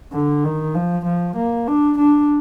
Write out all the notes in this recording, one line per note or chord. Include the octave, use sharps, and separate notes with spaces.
D3
D#3
F3
F3
A#3
D4
D4